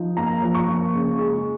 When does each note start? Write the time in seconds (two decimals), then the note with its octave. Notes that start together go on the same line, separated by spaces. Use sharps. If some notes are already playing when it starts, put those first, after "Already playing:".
Already playing: F3 D#4
0.17 A#3 A#5
0.42 F3
0.54 C#6
0.68 A#3
0.94 C#3
1.19 G#3